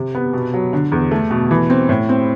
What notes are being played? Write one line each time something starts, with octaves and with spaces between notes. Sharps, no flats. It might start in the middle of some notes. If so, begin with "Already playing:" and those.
Already playing: C3
B3
B2
F#3
D3
E2
A3
B2
E3
C4
A2
C4